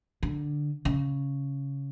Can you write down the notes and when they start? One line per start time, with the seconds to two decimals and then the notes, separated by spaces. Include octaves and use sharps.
0.23 D3
0.85 C#3